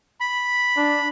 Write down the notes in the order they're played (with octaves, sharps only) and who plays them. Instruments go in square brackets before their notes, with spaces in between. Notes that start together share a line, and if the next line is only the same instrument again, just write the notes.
[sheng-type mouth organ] B5
[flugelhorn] D4